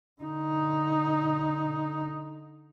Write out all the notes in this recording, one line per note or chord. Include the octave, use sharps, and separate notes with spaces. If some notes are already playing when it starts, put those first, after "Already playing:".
D3 D#4